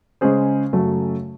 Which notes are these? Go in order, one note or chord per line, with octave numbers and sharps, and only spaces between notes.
C#3 G#3 C#4 G#4 C5
F#2 C#3 F#3 A3